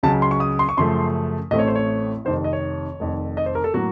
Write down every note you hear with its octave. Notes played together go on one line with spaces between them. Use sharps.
C#2 C#3 F#3 A5
C6
C#6
D#6
C6
C#6
F#2 C#3 F3 A3 C6
A1 A2 A3 C4 D#5
C#5
C5
C#5
F1 F2 C3 D#3 C5
D#5
C#5
F1 F2 D#3
D#5
C5
A#4
A4
A2 F#3 A#3 F#4